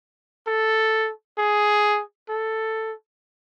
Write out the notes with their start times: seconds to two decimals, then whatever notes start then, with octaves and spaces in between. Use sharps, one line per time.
0.47 A4
1.38 G#4
2.29 A4